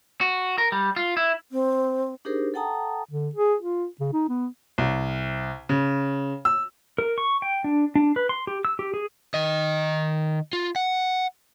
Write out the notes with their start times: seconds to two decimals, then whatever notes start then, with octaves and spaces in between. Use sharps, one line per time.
0.21 F#4
0.58 A#4
0.72 G3
0.96 F4
1.17 E4
1.52 C4
2.25 D4 D#4 G4 G#4 A#4 C5
2.54 A4 F#5 G5 A5 A#5 D#6
3.11 D3
3.35 G#4
3.61 F4
4.00 C#3
4.13 D#4
4.29 B3
4.78 C2
5.69 C#3
6.45 E6
6.98 A#4
7.18 C#6
7.42 G5
7.64 D4
7.95 D4
8.16 B4
8.29 C6
8.47 G4
8.65 E6
8.79 G4
8.94 G#4
9.34 D#3 D#5
10.53 F4
10.76 F#5